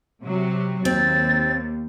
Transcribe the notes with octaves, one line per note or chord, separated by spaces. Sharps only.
C3 F#3
D#2 C4 A6